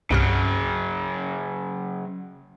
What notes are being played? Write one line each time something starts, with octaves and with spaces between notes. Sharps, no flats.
C2 G2 C#3 F#3 F6